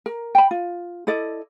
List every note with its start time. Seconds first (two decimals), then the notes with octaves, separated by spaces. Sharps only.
0.06 A#4
0.35 G5 B5
0.51 F4
1.07 E4 A4 D5 D#5